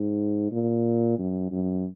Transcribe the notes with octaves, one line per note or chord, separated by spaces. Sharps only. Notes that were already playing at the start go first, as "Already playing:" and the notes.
Already playing: G#2
A#2
F#2
F#2